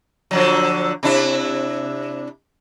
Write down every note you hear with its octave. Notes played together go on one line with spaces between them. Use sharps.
D3 F3 F#3
C3 D4 E4